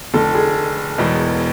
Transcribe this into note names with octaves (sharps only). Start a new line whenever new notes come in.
F1 F2 D3 A4
G#4
E1 E2 B2